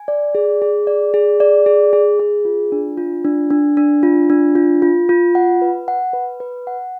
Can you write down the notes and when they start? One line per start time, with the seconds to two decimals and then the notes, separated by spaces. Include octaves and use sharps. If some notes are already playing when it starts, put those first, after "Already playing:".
Already playing: G#5
0.08 D5
0.35 G#4
0.62 G#4
0.87 D5
1.14 G#4
1.40 D5
1.66 G#4
1.93 G#4
2.20 G#4
2.45 F4
2.72 D4
2.97 F4
3.25 D4
3.50 D4
3.77 D4
4.03 F4
4.30 D4
4.55 F4
4.82 F4
5.09 F4
5.35 F#5
5.62 B4
5.88 F#5
6.13 B4
6.40 B4
6.67 F#5